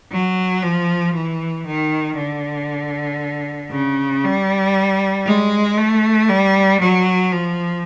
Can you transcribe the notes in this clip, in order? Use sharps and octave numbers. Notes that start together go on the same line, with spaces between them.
F#3
F3
E3
D#3
D3
C#3
G3
G#3
A3
G3
F#3
F3